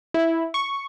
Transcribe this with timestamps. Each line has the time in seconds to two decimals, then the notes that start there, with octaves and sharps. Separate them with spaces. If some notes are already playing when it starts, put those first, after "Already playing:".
0.14 E4
0.54 C#6